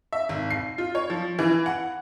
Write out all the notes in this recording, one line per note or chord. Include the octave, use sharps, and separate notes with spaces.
E5
G#1
C7
F4
C#5
F3
E3
F#5